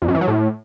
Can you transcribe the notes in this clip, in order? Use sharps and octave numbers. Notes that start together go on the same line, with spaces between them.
F2
F#2
E3
F#3
A2